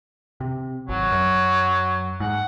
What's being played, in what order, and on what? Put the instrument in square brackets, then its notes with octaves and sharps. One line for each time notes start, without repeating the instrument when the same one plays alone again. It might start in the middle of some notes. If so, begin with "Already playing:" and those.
[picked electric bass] C3
[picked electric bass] G#1 [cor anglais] F#3
[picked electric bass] F#2
[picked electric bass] G#2 [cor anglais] F#5